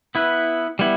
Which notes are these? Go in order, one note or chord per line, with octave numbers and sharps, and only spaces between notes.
B3 E4 B4
G3 B3 E4